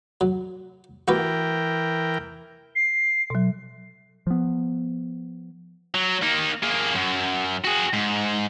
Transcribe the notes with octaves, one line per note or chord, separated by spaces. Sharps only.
F#3
E3 F#4 G4 A#4 B4 G5
C7
B2 F#3
F3 B3
F#3
A#3 D#4
A#3 G#4
F#2
F#4 G#4
G#2